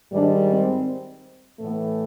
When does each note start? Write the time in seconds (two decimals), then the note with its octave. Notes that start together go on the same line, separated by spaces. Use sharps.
0.11 G#2 D#3 G3 D4
0.49 C4
1.59 A2 E3 A3 B3